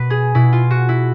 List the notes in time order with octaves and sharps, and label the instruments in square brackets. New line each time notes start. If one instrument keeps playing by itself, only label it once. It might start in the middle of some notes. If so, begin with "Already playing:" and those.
Already playing: [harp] B2 B4
G#4
B2 E4
F4
F#4
E4